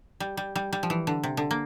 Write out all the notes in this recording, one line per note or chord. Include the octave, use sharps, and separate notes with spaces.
G3
G3
G3
G3
F3
E3
D3
C3
D3
A#3